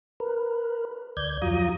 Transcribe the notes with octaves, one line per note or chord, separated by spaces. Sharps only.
A#4 B4
D2 D5 G6 G#6
F2 F#3 F4 A#5 D#6